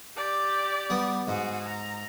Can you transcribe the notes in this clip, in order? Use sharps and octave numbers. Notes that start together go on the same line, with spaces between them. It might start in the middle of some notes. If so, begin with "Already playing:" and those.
G4 D5
G3 B3
G#2 F#4 G#4
A#5